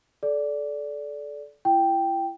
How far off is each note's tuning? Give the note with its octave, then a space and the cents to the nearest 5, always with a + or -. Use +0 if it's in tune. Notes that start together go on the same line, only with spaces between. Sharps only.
A4 -30 D5 -10
E4 +35 G5 +0